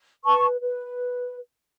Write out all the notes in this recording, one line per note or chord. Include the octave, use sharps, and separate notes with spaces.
B4 A5 C#6
B4